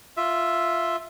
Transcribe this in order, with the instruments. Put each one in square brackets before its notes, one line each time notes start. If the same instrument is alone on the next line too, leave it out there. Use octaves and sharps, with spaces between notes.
[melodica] F4 E5